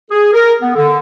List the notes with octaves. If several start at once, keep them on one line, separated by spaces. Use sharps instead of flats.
G#4
A#4
B3
D3